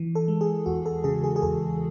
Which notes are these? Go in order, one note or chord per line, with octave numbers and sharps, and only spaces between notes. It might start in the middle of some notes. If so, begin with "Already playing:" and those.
Already playing: E3
A4
G#3
G#4
E2 F#4
A4
C#3 G#4
G#4
G#4
E2 A4